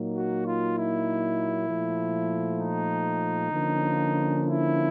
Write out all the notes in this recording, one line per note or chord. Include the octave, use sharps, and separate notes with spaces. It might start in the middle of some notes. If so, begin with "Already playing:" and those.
Already playing: A#2 F#3 A#3 D#4
F#4
F4
E4
A#2 F3 A3
D#4
D3 F3 A#3 C#4
E4